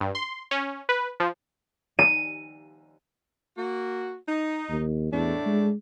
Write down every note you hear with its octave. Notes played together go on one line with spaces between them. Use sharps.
G2
C6
C#4
B4
F3
D#7
A#3 F#4
D#4
D#2
E2 A2 A3 D4
G#3